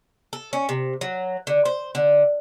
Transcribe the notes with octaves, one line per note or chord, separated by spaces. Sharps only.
A4
C#4
C3
F#3
D3
C5
D3